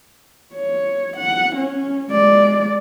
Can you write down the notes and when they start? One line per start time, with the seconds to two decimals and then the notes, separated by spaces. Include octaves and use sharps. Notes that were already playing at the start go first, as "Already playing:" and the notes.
0.54 C#5
1.16 F#5
1.55 C#4
2.11 G#3 D5